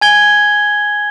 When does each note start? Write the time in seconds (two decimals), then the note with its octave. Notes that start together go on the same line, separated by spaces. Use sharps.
0.01 G#5 G#6 G7